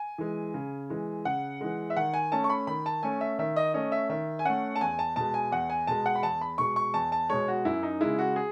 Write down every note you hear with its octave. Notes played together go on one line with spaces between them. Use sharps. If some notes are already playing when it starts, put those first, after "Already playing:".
Already playing: G#5
E3 G#3
C#3
E3 G#3
C#3 F#5
E3 G#3
E5
D#3 F#5
G#5
A3 C#4 A5
C#6
B5
D#3 B5
A5
A3 C#4 G#5
E5
D#3 E5
D#5
A3 C#4 D#5
E5
D#3 E5
G#5
A3 C#4 F#5
A5
E2 G#5
A5
B2 G#3 A5
G#5
E2 F#5
G#5
B2 G#3 A5
F#5
B5
E2 A5
B5
B2 G#3 C#6
C#6
E2 A5
A5
B2 G#3 C#5
F#4
F#2 E4
D#4
C#3 G#3 E4
F#4
G#4